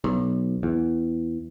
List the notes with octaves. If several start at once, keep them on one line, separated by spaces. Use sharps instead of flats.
B1
E2